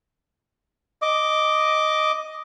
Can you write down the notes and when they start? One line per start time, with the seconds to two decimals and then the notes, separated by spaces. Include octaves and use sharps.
1.02 D#5 D6